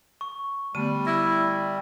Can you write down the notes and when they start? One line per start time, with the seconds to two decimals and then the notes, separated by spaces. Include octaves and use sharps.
0.21 C#6
0.75 D3 G3 A3 B3 D#7
1.07 E4 E6 A#6